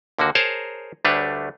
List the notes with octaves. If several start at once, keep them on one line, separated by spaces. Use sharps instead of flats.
D#2 D3 A#3 F#4
G#4 A#4 C5 C#5 A5 A#5
D2 G3 A3 D4 B4 C#5